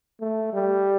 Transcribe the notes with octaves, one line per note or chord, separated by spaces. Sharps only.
A3
G3